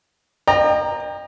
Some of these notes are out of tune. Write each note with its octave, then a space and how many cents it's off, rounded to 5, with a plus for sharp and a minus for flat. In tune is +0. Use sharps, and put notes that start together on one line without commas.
D#5 -40 G5 +25 A#5 +0